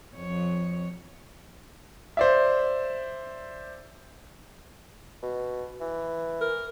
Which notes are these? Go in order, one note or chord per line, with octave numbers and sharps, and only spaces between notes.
F2 C#5
C5 D5 E5
B2
E3
A#4